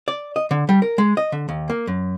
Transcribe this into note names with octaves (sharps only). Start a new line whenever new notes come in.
D5
D#5
D3
G3
A#4
G#3
D#5
D3
D#2
A#3
F#2